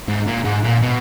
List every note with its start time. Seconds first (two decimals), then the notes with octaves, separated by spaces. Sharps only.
0.08 G#2
0.27 A#2
0.45 G#2
0.64 A#2
0.82 B2